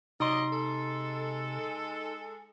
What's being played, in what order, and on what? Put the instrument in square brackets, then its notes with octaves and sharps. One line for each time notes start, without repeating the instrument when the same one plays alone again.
[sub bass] C3 [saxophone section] F#3 D5 D#5 [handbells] D#4 C6
[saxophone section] G#3 A4